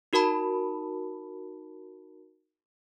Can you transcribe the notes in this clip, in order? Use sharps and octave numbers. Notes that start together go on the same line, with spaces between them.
D#4 F#4 A#4 A5 B5